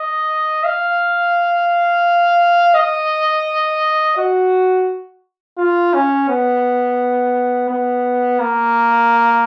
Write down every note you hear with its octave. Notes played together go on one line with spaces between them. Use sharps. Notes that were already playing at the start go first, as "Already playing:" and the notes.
Already playing: D#5
F5
D#5
F#4
F4
C#4
B3
B3
A#3